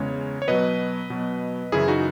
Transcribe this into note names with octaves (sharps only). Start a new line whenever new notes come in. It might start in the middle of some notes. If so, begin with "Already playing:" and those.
Already playing: E2 C#3 G#3 C#5
C#5
B2 F#3 B4 D#5
B2 F#3
F#2 C#3 E3 E4 G#4
D#4 F#4